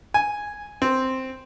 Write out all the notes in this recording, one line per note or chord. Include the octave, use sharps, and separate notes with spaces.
G#5
C4